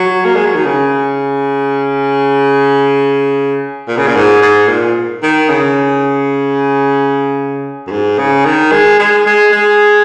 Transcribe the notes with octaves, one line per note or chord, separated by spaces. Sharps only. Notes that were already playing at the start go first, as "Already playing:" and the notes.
Already playing: F#3
A#3
G#3
F#3
D#3
C#3
A#2
C#3
A#2
G#2
G#2
A#2
D#3
C#3
F#2
G#2
C#3
D#3
G#3
G#3
G#3
G#3